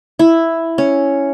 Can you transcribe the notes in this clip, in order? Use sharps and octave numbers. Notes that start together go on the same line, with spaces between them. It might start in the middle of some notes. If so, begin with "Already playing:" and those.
E4
C#4